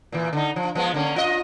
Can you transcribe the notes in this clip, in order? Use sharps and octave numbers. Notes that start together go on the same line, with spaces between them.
A#2 E3
D3 D#4
F3
F3 G#3 B3
D3 A#3 C#4
F4 D#5